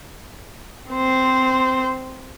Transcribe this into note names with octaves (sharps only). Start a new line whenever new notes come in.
C4 C5